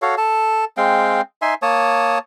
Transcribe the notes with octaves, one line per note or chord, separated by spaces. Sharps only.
F#4 A4 C#5 F5
A4 A5
G#3 C4 F5 G5
D#4 E5 G#5 C6
A#3 C#5 A5 D#6